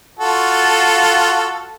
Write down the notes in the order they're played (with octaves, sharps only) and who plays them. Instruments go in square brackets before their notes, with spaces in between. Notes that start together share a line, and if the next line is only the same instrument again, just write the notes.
[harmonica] F4 F#4 A4